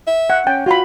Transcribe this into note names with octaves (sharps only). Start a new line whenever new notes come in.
E5
F#5
C#4 G5
F4 F#4 B5